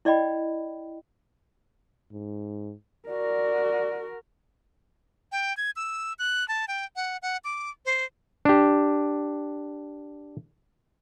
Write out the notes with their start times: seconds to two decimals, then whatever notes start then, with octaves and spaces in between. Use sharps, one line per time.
0.05 E4 D5 D#5 G5 B5
2.12 G#2
3.09 F#4 A#4 D5
5.32 G5
5.57 G#6
5.76 E6
6.19 F#6
6.48 A5
6.68 G5
6.96 F#5
7.22 F#5
7.44 D6
7.86 C5
8.45 D4 G4